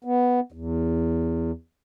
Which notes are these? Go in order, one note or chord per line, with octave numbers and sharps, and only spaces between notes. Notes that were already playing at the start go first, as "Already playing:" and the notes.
B3
E2